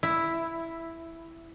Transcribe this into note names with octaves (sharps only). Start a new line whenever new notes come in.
E4